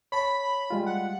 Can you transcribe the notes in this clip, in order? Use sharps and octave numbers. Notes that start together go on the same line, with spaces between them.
C#5 A5 B5
G3 G#3 F4
F#5